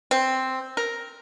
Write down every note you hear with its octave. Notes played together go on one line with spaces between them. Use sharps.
C4
A#4